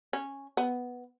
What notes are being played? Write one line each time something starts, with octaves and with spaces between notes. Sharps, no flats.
C#4
B3